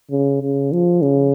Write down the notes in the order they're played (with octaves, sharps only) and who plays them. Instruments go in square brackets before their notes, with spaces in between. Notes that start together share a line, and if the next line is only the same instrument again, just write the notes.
[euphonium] C#3
C#3
F3
C#3